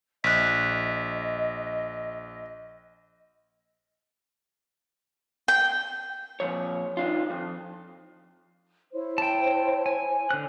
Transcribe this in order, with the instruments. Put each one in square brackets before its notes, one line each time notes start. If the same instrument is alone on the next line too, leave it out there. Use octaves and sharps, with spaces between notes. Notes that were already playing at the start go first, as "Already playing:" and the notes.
[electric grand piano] A#1 [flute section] D#5 [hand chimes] F#6 B6
[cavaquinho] G5
[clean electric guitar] A#2 C#3 F3 C#5
D#3 D4 F4
F2
[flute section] E4 C5 C#5
[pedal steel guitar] G5 A5
G#5
D3 F#6